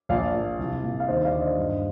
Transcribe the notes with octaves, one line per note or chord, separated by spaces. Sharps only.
A#1 D5 F5
A#2
C2
A#2
F5
D#2 C5 D#5
D5 F5
D3
C5 D#5
G2